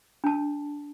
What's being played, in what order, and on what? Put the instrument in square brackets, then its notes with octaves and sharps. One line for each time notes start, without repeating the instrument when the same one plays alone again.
[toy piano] D4 A5